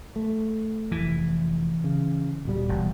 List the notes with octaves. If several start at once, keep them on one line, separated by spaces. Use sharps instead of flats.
A3
F1 E3
C#3
D#1 B2 G3
E1